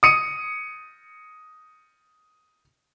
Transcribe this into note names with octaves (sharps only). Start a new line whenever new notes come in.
D#6 C#7 D#7